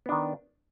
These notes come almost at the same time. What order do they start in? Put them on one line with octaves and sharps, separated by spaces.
B3 D4 D#3